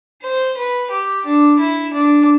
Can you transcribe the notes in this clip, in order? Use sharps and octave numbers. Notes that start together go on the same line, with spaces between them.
C5
B4
G4
D4
E4
D4